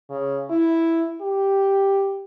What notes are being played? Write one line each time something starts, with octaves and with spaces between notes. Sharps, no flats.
C#3
E4
G4